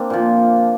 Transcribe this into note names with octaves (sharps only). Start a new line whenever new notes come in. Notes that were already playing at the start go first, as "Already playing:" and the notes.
Already playing: A#3 C4 D4
A#2 F3